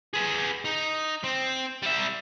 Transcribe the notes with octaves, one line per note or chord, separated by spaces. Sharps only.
G#4 B4
D#4
C4
G3 E5